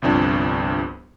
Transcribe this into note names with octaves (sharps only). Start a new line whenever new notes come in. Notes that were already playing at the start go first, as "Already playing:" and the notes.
G1 C2 F2 D4 G#5